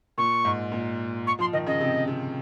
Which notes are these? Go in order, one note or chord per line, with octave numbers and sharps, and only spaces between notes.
A#2 C#6
G#2
A#2
C#6
F3 C6
D#3 D#5
C#3 D#5
C3
C3